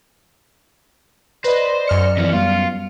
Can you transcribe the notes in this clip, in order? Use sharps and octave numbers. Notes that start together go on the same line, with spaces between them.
B4 C5 D5 D#5 A#6
F#2 F6 C#7
F2 E3
G3 B3 F4